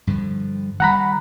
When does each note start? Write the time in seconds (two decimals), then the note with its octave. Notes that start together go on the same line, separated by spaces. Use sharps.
0.07 G2 D3 F3
0.80 D#3 F#3 G3 F#5 A#5 B5